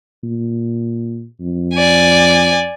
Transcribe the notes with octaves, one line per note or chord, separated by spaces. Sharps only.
A#2
F2
D5 G#5